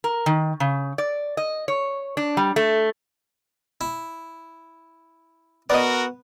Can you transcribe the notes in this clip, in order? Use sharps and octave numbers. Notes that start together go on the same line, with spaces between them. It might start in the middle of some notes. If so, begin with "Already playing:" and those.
A#4
D#3
C#3
D5
D#5
C#5
D4
G3
A3
E4
B3 F#4 A#4 D5 D#5